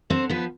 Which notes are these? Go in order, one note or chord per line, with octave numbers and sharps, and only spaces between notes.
D3 C4 C5
F3 B3 B4